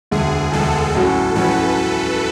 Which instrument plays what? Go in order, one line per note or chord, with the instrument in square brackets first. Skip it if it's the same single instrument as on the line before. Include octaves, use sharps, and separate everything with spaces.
[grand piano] E1 D2 D3 [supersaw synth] G#4
[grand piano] E1 D2 D3 [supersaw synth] A4
[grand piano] A1 A2 F#3 C#4 F#4
[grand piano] A1 A2 F#3 C#4 F#4 [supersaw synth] B4